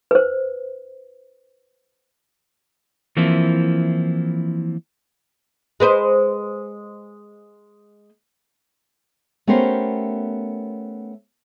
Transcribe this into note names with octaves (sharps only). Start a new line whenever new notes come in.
B4 C5
E3 F3 A#3 C4 E4
G#3 B4 C5
A3 B3 C#4 G4 A#4 C5